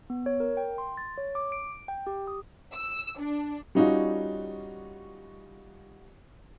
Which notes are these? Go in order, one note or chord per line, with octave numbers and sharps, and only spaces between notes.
B3
C#5
A#4
G5
C6
A6
C#5
D6
D7
G5
G4
D#6
E6
D4
G3 C#4 D#4 F4 F#4